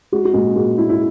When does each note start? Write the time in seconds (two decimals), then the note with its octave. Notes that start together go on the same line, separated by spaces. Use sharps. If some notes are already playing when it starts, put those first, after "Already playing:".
0.12 G#3 F#4
0.25 F#4
0.34 A#2 G#3 G#4
0.56 A#2 F#4
0.77 G#3 E4
0.89 E4